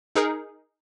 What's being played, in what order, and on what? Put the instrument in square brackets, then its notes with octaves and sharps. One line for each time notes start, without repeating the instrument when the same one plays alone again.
[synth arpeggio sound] D#4 G#4 A#4